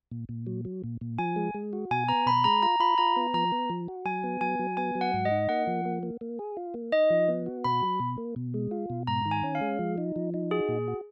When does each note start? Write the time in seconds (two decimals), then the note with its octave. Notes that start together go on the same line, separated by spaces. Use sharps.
0.11 A#2
0.29 A#2
0.47 F#3
0.65 F#3
0.84 A#2
1.01 A#2
1.19 F3 G#5
1.36 G#3
1.54 G#3
1.73 F#4
1.91 B2 G#5
2.09 B3 A#5
2.26 B2 B5
2.44 G#3 A#5
2.63 F4 A#5
2.80 F4 B5
2.98 F4 A#5
3.16 B3
3.34 F3 A#5
3.52 B3
3.70 F3
3.88 F#4
4.05 F#3 G#5
4.24 B3
4.41 F#3 G#5
4.59 F#3
4.77 B3 G#5
4.95 F#3
5.01 F#5
5.14 G#2
5.25 D#5
5.31 D#4
5.49 A#3 F#5
5.67 F3
5.85 A#3
6.03 A#3
6.21 A#3
6.39 G#4
6.57 F4
6.74 A#3
6.92 D#4 D#5
7.10 F3
7.28 B3
7.46 F#4
7.64 B2 B5
7.83 F#3
8.00 B2
8.18 A#3
8.36 B2
8.54 G#3
8.71 F4
8.90 B2
9.07 G#2 A#5
9.26 D#3
9.31 G#5
9.44 C#4
9.55 F5
9.61 G#3
9.79 F3
9.98 D#4
10.16 F3
10.34 D#4
10.51 F#4 G#4
10.68 A#2
10.88 F#4